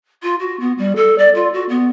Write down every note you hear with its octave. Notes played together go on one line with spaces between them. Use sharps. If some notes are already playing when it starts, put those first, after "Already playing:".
F4
F#4
B3
G3
A4
D5
F4
F#4
B3